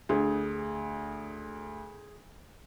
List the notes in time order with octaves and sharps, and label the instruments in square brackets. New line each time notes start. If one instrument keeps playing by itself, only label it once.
[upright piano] D2 [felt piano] G#4